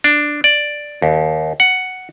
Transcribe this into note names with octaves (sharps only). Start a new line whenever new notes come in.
D4
D5
D#2
F#5